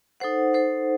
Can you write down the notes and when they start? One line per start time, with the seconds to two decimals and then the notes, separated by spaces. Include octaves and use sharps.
0.20 D#4 A4 C5 F#5
0.53 D#4 A4 C5 F#5